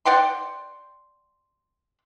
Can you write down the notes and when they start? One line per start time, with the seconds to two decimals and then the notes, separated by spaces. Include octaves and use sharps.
0.05 D5 F#5 G5 C6